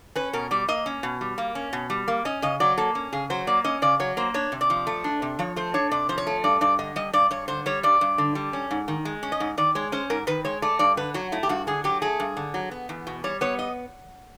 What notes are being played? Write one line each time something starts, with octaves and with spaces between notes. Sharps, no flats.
C#4 B4
B2 A#4
G3 D5
A#3 D#5
C#4
B2
G3
A#3
C#4
B2
G3
A#3
C#4 D#5
C#3 D#5
F#3 D5
A#3 A4
C#4
C#3 G#4
F#3 C5
A#3 D5
C#4 D#5
C#3 D5
F#3 C#5
A#3 C5
D4 C#5
C3
D5
F3
A3
D4
C3
F3 C#5
A3 C5
D4 C#5
C3 D5
F3 C5
C#5
A3
G2 D5
G2 D5
D3 D#5
G3 D#5
G2 D5
G2 C#5
D3 C5
G3 C#5
G2 D5
G2
D3
G3
C#4
G#2
D#3
G#3
C#4
D#5
G#2
D#3 D5
G#3 C#5
C#4 C5
G#2 A#4
D#3 B4
G#3 C#5
A3 D5
G2 D5
D3 B4
F#3 F#4
A3 E4
G4
G2 F#4
D3 G#4
F#3 G4
A3 G#4
G2
D3
F#3
B3
E2
B2
G3 C#5
B3 C#5
D#5